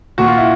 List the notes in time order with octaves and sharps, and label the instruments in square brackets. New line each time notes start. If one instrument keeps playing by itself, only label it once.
[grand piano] A#2 F#4
F4
E4